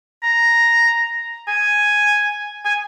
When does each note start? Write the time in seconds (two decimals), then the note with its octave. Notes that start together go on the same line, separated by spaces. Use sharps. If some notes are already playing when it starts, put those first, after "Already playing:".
0.23 A#5
1.48 G#5
2.65 G#5